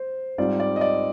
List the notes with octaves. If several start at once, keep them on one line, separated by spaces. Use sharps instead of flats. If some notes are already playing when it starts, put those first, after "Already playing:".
Already playing: C5
G#2 G3 C4 F4 D5
D5
D#5
D5